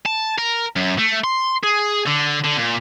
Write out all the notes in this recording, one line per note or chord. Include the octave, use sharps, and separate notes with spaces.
A5
A#4
F#2
A3
C6
G#4
D3
D3
A#2